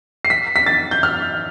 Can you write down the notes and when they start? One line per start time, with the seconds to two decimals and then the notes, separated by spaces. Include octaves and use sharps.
0.25 C7
0.30 B6
0.56 B6
0.66 A6
0.91 G6
1.03 F6